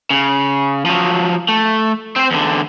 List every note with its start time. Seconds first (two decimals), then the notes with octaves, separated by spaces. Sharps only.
0.10 C#3
0.85 F3 F#3
1.49 A3
2.16 C4 C5
2.31 E2 D3